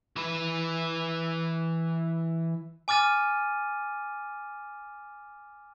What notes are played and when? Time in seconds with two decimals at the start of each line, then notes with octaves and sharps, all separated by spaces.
0.16 E3 B4
2.88 G#5 D6 F6 A6 D#7